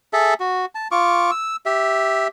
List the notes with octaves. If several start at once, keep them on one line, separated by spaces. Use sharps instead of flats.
G#4 A4 E5 A5
F#4
A5
F4 C#6 D6
E6
G4 E5